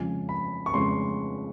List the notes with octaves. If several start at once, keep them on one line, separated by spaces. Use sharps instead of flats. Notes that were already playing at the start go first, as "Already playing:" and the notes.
Already playing: F2 C#3 F3 G#3 G#5
B5
C#6
F2 C#3 F3 G#3 C6